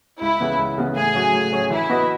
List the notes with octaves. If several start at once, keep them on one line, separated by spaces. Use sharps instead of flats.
C#2 E4
C#3 E3 B3
C#2
C#3 E3 B3
A2 G#4
F#3 C#4 F#4 C#5
A2
F#3 C#4 F#4 C#5
E3 E4
B3 F#4 B4 D#5